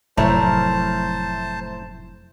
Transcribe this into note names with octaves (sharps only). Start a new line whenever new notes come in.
F1 A2 F#3 A3 E4 A#4 C5 A5